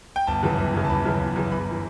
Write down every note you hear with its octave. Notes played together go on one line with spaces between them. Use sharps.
G5
G1 A5
F#2 C#3 E3
G1
F#2 C#3 E3
A5
G1 B5
F#2 C#3 E3
G1
F#2 C#3 E3
G1 B5
E3